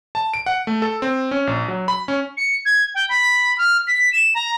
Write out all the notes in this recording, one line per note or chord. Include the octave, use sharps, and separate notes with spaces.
A5
D7
F#5
A3
A4
C4
C#4
A#1
F#3
B5
C#4
C#7
G#6
G5
B5
F6
B6
E7
A#5